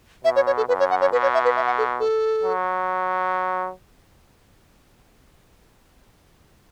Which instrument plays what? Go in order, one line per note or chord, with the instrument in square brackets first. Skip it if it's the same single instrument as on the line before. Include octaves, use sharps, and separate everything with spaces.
[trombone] B2 [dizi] E5
[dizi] C#5
C#5
A4
[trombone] F#2 [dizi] B4
[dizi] C#5
F#5
C#5
[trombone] B2 [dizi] B4
[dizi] C#5
E5
B4
E5
F#5
A4
A4
[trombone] F#3